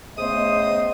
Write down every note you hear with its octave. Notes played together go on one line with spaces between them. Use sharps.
C#3 A3 B3 C5 D#5 D#6